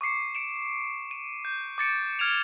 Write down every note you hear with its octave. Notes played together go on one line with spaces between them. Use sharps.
C#6 D6 C7 C#7
C#7 D7 E7
D#7
G6
D6 A6 C#7 D7
F6 G#6 D7 E7 F7